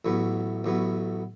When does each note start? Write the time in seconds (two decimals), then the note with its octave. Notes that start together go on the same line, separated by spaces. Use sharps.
0.05 A1 A2 F#3 B3
0.64 A1 A2 F#3 B3